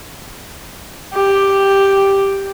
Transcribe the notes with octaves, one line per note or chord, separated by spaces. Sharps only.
G4